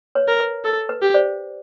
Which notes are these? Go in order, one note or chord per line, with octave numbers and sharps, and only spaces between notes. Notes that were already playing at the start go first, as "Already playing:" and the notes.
B4 C#5
A#4
B4
A4 A#4
B4
G4
C5 D5